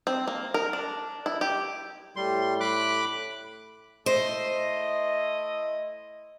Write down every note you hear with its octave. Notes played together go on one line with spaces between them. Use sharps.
C4
A#3
A#4
D4
E4
G4
A2 G3 C6
B5 D6 F#6
A3 E4 C5 D#5